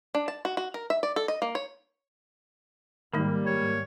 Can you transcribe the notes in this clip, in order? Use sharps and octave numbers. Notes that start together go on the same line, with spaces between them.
D4
A5
F#4
F#4
A#4
E5
D5
A4
D#5
A#3
C#5
G#2 D#3 G3 G#3 A#3 D#4
C#5